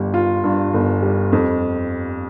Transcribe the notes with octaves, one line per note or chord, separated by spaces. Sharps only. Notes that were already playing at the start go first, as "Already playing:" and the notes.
Already playing: G1 G3
F4
G2
G1
G3
F2